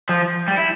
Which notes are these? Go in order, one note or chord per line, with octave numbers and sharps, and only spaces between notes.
F3
G3
E4